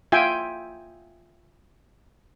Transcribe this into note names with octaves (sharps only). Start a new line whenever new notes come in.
F4 E5 G5 G#5